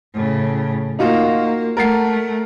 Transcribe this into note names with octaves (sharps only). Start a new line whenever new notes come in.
A2 C#3
A#3 D#4 F4 F#4
A3 A#4 F#5 C7